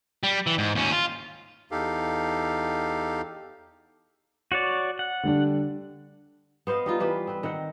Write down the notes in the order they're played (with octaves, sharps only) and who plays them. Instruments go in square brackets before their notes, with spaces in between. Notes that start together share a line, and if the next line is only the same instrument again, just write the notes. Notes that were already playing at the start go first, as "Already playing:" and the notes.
[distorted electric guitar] G3
E3
G#2
D#2 C#4
F4
[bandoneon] E2 D#4 G4 A4 F5
[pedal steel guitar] F#4 C#5 D5
F#5
[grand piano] D3 G3 D4
[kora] B3 C5 D#5 F5
G3 D#4 F4
E3 G4 B4 C5
C4 B4
D#3 C4 F#5